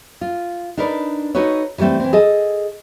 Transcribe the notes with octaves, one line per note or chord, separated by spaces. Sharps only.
F4
D4 D#4 A#4 B4 D5
D#4 F#4 A4 B4 C#5
E3 F#3 G3 A3 C4
E3 C4
G#4 A4 D#5